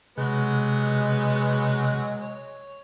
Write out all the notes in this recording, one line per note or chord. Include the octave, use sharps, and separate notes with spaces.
C3 F#3 G#3 B3 F#6
C#5